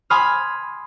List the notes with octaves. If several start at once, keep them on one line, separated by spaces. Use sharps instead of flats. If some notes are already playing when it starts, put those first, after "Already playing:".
G#5 B5 C6 D#6 F6